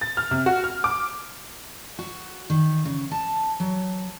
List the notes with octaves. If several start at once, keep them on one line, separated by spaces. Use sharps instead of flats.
A6
F6
C3
F#4
F6
D6
F#4
D#3
C#3
A5
F#3